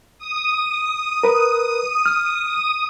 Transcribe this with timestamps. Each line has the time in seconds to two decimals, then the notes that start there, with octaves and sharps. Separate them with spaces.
0.18 D#6
1.23 A#4 B4
2.06 F6